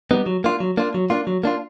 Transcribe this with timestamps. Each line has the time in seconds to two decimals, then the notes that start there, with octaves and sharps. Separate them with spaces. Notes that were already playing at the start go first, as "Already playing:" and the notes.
0.11 G3 B3 D#4
0.26 F#3
0.44 A#3 D4 F4
0.60 F#3
0.77 A#3 D4 F4
0.94 F#3
1.10 A#3 D4 F4
1.27 F#3
1.43 A#3 D4 F4